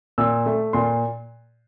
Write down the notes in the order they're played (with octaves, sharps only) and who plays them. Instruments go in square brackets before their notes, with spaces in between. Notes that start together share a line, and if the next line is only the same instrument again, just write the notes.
[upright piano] A#2 E6
A3
A#2 C6